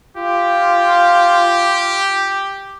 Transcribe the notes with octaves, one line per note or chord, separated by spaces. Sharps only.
F4 G4